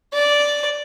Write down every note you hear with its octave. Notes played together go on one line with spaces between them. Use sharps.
D5